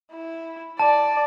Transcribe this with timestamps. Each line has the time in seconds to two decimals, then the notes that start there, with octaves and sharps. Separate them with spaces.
0.12 E4
0.79 D5 A5